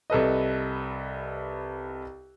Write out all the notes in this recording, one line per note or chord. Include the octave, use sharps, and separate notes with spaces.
C2 A4 B4 D#5